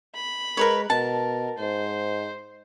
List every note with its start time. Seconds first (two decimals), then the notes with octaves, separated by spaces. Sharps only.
0.15 B5
0.57 G#3 A#4 B4 C#5
0.90 B2 A#4 A5
1.58 G#2 C5